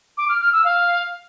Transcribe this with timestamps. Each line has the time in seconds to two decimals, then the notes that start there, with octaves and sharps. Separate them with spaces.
0.17 D6
0.29 F6
0.41 F6
0.53 E6
0.64 F5